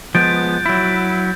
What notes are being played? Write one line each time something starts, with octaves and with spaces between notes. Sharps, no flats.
F3 G#3 B3 G6 A6 D7
F#3 E4